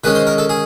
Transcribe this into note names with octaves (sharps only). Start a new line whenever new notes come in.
D#3 G#3 C#4 B4
C5
A#4
A4
G#4